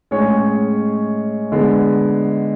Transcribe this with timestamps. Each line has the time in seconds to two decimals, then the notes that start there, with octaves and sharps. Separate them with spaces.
0.11 A2 G#3 C#4 G#4 C#5
1.52 D3 G#3 B3